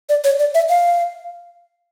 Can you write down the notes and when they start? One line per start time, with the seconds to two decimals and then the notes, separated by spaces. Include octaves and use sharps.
0.09 D5
0.24 C#5
0.39 D5
0.54 E5
0.69 F5